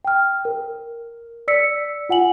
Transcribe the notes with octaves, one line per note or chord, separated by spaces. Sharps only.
G5 F6
A#4
D5 E6 B6 C#7
F4 F#5 G#5 F#7